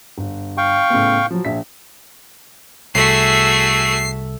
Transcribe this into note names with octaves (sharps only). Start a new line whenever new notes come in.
G1
F5 G5 C#6
A2 C#3 B3
F3 F#3
A#1 E5 B6
C2 A3 F#4 G#4 E5 C7